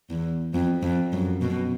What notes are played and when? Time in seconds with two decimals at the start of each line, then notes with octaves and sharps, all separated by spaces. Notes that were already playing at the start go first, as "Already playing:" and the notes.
0.10 E2
0.54 F2
0.83 F2
1.13 F#2
1.42 B2